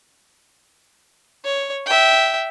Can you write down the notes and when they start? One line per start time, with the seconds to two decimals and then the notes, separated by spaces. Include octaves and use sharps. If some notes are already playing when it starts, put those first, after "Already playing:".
1.45 C#5
1.86 E5 G5